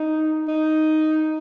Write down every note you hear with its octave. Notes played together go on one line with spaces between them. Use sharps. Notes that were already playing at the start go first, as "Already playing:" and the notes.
Already playing: D#4
D#4